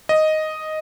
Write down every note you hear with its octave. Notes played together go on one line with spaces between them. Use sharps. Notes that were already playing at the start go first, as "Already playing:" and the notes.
D#5